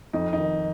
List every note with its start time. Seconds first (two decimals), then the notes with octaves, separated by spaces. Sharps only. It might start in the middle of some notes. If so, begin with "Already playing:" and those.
0.13 F2 D#4
0.33 D#4
0.38 D#3